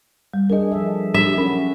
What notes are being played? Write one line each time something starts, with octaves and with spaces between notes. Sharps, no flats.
G3
G3 D4 G#4 A#4 D#5
F3 A4 E5
F#3 G3 D4 G4 E5
C#4 F#4 A#4 B5